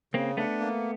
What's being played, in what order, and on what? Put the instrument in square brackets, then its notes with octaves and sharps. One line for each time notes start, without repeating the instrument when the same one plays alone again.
[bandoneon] C#3 [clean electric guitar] A#3 C4
[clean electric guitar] A3 B3 [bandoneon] D4
[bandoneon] A#3